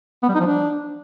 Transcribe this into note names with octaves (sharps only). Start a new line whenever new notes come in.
B3
G3
D#4
F3
D4